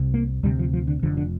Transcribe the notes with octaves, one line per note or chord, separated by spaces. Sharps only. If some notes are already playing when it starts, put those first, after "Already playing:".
Already playing: C2 C3
A#3
D2 C3 G3
F3
F3
D3
F1 F2 D3 F3
D3